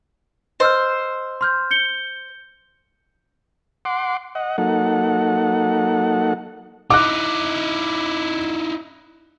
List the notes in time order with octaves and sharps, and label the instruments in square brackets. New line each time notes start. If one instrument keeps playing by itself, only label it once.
[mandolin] C5 [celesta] D#5 E6 F6
[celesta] C6 F6 G6
G6 C#7 G7
[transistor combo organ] F#5 C6 D6
D#5 F#5
F#3 A#3 D#4 A4 F#5
[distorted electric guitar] D#4 E4 [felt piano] D6 F#6